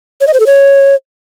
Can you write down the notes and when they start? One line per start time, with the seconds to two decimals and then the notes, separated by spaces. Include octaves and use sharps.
0.21 C#5
0.27 D#5
0.34 C5
0.40 A4
0.46 C#5